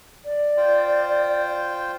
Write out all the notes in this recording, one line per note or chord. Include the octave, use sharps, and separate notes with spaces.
D5
F4 C5 G5